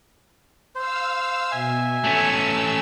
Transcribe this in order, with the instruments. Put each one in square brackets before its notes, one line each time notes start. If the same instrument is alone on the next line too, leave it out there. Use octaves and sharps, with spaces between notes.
[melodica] C5 [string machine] F5 E6
[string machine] B2 [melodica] E5 G#5
[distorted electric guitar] A3 C#4 [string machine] E6